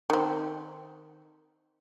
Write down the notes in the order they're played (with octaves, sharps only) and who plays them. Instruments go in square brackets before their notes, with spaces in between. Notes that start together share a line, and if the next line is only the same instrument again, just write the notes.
[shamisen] D#3 C4